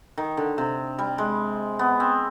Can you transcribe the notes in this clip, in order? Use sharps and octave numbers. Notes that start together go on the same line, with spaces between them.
D#3
D3
C3
G3
G#3
B3
C4